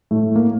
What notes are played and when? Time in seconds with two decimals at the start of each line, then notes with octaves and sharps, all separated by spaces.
0.11 A2 A3
0.36 A#3